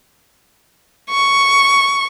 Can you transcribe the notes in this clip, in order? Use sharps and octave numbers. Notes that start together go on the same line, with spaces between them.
C#6